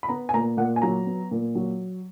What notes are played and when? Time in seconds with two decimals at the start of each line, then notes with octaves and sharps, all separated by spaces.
0.03 B5
0.09 B3 A#5
0.29 G#5
0.34 A#2 A#5
0.57 A#2 F#5
0.76 G#5
0.82 F#3 A#5
1.06 B3
1.31 A#2
1.55 F#3